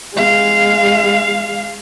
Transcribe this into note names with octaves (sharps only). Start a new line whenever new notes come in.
G#3 F5